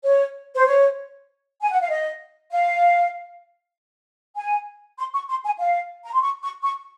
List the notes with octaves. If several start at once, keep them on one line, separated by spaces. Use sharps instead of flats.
C#5
C5
C#5
G#5
F#5
F5
D#5
F5
G#5
C6
C#6
C6
G#5
F5
A#5
C6
C#6
C#6
C#6